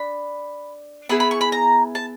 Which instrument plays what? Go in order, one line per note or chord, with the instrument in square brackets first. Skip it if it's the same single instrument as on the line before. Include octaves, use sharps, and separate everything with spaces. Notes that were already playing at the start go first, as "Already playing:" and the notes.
Already playing: [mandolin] D4 B5
B3 E4 G#4 B5
B5
C#6
B5
A#5
A5